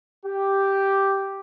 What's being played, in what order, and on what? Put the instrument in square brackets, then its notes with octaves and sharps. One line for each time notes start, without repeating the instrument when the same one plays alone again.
[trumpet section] G4